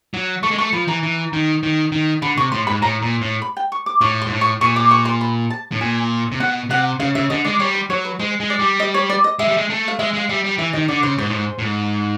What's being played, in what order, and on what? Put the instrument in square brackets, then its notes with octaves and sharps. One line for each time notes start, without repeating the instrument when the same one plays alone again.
[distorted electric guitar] F#3
[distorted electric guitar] A3 [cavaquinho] C#6
[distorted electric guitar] G#3
[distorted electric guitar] A3 [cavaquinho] C#6
[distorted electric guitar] F3 [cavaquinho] B5
[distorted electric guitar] E3 [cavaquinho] A#5
[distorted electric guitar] E3
D#3
D#3
D#3
[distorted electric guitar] D3 [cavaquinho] B5
[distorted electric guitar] C3 [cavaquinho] C#6
[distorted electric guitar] A2 [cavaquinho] C6
[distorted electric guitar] G#2 [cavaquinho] B5
[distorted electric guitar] A2 [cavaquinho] A#5
[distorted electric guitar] A#2
A2
[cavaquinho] B5
G5
C#6
D6
[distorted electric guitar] A2 [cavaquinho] C#6
[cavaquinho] C6
[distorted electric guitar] G#2
A2
[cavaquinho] C#6
[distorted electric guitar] A#2 [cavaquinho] C#6
[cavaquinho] D6
C#6
C6
B5
A5
[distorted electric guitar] A2
[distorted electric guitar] A#2 [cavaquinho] G#5
[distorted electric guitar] C3
[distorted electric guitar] B2 [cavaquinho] F#5
[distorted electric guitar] C3 [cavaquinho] F#5
[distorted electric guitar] C#3 [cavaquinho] F5
[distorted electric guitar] C#3 [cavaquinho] E5
[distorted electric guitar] D3 [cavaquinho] D#5
[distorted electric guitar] G#3 [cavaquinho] D5
[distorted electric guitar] G3 [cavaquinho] C#5
[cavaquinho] C5
[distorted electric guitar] F#3 [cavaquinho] C#5
[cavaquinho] B4
[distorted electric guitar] G#3 [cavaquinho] C5
[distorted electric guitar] G#3
[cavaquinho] D5
[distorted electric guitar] G3
[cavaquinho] D#5
C#5
D5
D#5
[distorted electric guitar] G#3 [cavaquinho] E5
[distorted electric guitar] G3
G#3
A3
[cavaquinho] F5
[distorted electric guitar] G#3 [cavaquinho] E5
[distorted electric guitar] G#3 [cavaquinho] F5
[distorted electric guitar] G3 [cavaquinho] E5
[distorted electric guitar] G3
[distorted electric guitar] E3 [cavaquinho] E5
[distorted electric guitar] D#3 [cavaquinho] D#5
[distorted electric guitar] D3 [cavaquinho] D5
[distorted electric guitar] C#3 [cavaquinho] C5
[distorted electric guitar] G#2 [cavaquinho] C5
[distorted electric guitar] A2
G#2
A2
G#2